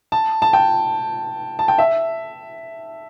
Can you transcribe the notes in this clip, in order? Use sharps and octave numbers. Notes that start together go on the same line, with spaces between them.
A5
A5
G5
A5
G5
E5